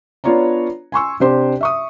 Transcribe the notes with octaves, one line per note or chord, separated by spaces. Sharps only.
B3 D4 F4 C#5 D5 A#5
G#5 C6 C#6 E6
C3 D4 G4 C5 C6
E5 C#6 D#6